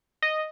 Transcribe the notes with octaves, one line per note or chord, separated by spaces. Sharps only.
D#5